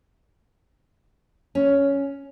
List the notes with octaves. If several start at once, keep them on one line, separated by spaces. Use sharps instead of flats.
C#4